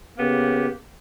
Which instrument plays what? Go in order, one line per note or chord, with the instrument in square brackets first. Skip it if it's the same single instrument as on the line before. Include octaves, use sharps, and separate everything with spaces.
[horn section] C#3 A#3 B3 G4